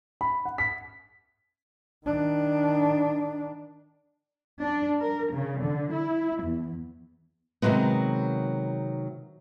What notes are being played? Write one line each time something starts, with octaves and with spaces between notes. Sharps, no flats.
B5
F#5
B6
D#3 D4
D4
A#4
C#3
D3
E4
E2
C3 D#3 F#3 G#3 B3